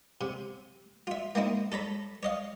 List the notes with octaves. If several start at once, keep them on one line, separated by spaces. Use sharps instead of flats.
C3
F4 E5
A#3 C4 D#4 E4
A4 C#5 A#5 B5
C#5 D#5 F5